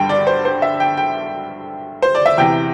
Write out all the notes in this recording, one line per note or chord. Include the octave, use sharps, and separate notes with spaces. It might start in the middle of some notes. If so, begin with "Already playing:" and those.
Already playing: G2 D3 G3 G5
D5
C5
C5
E5
G5
G5
C5
D5
E5
E2 C3 E3 G5